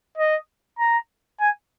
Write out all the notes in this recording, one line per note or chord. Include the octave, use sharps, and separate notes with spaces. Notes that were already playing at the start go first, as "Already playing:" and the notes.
D#5
A#5
G#5